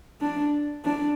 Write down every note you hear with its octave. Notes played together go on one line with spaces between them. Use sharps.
D4
D4